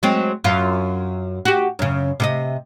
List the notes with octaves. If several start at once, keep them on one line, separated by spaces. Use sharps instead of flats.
F#3 G#3 C4
F#2 F4
F#4 G4
F#2 C#3
C3 G#4 D#5